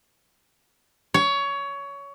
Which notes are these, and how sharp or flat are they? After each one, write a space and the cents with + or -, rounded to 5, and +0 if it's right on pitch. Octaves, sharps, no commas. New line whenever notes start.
C#5 +20